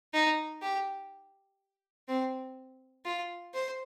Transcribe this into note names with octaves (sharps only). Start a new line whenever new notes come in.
D#4
G4
C4
F4
C5